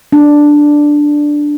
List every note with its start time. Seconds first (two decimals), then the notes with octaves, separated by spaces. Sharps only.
0.12 D4